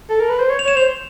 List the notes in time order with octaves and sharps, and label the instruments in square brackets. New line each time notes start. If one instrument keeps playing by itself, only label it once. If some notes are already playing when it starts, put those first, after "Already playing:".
[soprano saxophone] A4
A#4
B4
C5
C#5
[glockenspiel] F7
[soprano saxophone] C#5 [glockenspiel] E7
[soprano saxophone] C5 [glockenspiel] F7